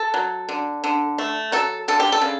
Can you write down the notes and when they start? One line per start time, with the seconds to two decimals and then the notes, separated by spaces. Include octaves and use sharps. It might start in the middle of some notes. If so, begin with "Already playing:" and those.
Already playing: A4
0.14 F#3
0.49 D3
0.84 D3
1.18 A3
1.52 F#3 A4
1.88 D3 A4
2.00 G4
2.12 A4
2.22 C#3